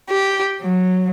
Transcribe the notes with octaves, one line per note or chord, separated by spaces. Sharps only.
G4
F#3